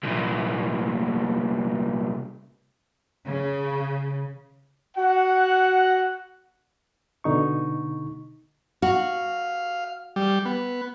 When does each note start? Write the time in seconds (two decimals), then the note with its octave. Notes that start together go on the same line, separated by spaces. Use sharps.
0.03 C2 A#2
3.25 C#3
4.97 F#4 F#5
7.24 B2 D3 D#4 C#6
8.82 F#4 F5
10.16 G3
10.45 B3